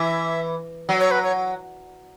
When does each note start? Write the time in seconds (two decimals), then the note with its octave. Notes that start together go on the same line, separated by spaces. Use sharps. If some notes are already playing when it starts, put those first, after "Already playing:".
Already playing: E3 E5
0.89 F#3
1.00 C#5
1.11 B4
1.23 C#5